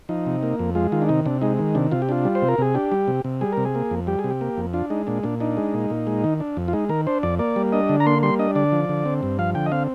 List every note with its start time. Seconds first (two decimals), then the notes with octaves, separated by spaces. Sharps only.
0.09 F3 D#4
0.26 C3
0.43 A#3
0.59 F2
0.75 G#3 F4
0.92 D#3 F4
1.02 D4
1.09 C3 D#4
1.26 C3 D4
1.42 G#3 D#4
1.59 D#3
1.75 C3 D4
1.91 C3 F4
2.02 G4
2.09 D4 F4
2.25 G3
2.35 C5
2.42 C3
2.48 A#4
2.58 C3 G#4
2.75 D4 G4
2.92 G3
3.08 C3
3.24 C3
3.41 G3 G#4
3.52 C3 A#4
3.65 G#4
3.75 A#3
3.91 F2
4.07 G3 G4
4.19 G#4
4.24 C3
4.30 G4
4.41 A#3
4.57 F2
4.73 D4 F4
4.90 G#3 D#4
5.07 A#2 D4
5.23 A#2 D4
5.40 D4 D#4
5.57 G#3
5.74 A#2
5.90 A#2
6.07 G#3
6.24 D#3
6.40 D4
6.57 F2
6.68 F4
6.73 G#3 D#4
6.89 D#3 A#4
7.07 D4 C5
7.23 F2 D5
7.39 A#3 D5
7.56 G3
7.73 D4 D#5
7.89 D3
8.00 A#5
8.06 A#3 C6
8.23 G3 C6
8.39 D4 D#5
8.55 D3 D5
8.72 F3
8.89 D3
9.05 C4
9.23 G2
9.39 F3 F5
9.55 D3 G5
9.66 D#5
9.72 C4 F5